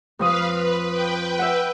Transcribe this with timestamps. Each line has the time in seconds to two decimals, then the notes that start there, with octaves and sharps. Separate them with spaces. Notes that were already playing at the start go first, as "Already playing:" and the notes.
0.19 F2 F3 B4 F5 D#6
0.56 B4
0.89 B4 G5
1.39 E5 F#5